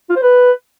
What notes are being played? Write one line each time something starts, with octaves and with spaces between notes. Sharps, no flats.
F4
C5
B4